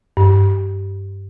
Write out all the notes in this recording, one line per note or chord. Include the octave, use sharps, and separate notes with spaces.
G2